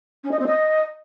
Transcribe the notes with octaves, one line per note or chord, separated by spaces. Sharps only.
C#4
D#5
C4
D#5